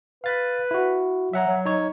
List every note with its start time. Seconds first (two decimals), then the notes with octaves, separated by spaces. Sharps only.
0.24 B4 F5 A6
0.71 E4 F#4
1.33 F#3 E5 F#5 A#5
1.47 F#3
1.65 D#4 C#5